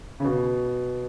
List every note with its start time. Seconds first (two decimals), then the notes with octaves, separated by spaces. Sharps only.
0.20 C#3
0.24 B2